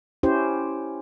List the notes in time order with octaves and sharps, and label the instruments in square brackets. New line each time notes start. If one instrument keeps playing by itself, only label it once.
[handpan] C#4 E4 G4 C5